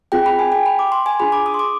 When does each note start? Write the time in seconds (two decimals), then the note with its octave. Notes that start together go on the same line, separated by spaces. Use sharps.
0.12 C4 F4 G#4 G5
0.26 B5
0.39 G#5
0.52 G5
0.66 B5
0.79 D6
0.92 C6
1.06 G#5
1.20 D4 F4 G#4 B5
1.32 D6
1.46 D#6
1.54 C6
1.59 D6